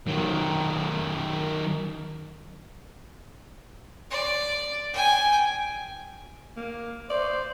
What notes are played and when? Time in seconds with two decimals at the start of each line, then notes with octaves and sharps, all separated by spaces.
0.07 D#3 F#3
4.11 D5
4.93 G5 G#5
6.57 A#3
7.10 C5 D5